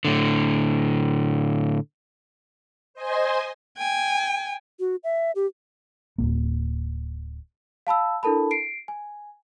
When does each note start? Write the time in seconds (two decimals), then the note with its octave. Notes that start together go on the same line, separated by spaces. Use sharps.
0.05 A2 D3
2.94 C5 D#5 G#5 C6
3.78 G5 G#5
4.80 F#4
5.04 E5
5.35 G4
6.18 D1 D#2 A#3
7.87 F5 A5 B5 E6
8.23 D4 E4 A4 A#4 A5 B5
8.51 C7 D7
8.88 G#5